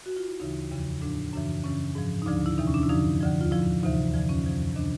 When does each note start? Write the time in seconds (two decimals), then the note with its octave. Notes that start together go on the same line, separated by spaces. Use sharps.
0.06 F#4
0.17 F4
0.28 E4
0.40 D2 C#3 E3 D#4
0.71 E2 C#3 F3
1.02 A2 F3 D4
1.33 F#2 C#3 E3 D4
1.64 F#2 C#3 E3 C#4
1.95 G#2 F3
2.22 D#4
2.26 D2 D3 F3 D4
2.46 E4
2.58 E2 C3 E3 D#4
2.67 C#4
2.74 D4
2.83 E4
2.89 F#2 D3 F3 D#4
3.21 D#2 D3 F3
3.41 F4
3.51 A2 F3 E4
3.83 D2 C3 E3 D#4
4.14 F2 D3 F3
4.29 C#4
4.46 F2 C3 F3
4.76 C3 D#3 D4